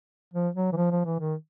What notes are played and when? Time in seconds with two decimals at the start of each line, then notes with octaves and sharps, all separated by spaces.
0.34 F3
0.55 F#3
0.72 E3
0.76 F3
0.91 F3
1.06 E3
1.20 D#3